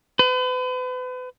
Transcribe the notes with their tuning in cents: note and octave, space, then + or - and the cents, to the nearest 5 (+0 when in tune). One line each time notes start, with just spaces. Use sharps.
B4 +40